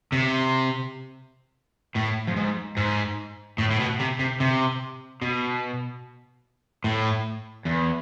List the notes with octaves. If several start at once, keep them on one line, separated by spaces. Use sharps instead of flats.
C3
A2
F2
G#2
G#2
A2
A2
B2
C3
C3
C3
B2
A2
E2